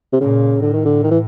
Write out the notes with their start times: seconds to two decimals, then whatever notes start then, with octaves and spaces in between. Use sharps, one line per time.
0.13 C3
0.21 A#2 C#3
0.61 A2 D3
0.73 D#3
0.85 D3
1.03 D#3
1.11 E3